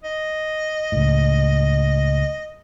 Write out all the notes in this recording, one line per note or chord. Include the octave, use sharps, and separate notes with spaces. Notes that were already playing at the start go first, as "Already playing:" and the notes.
D#5
C#2 A2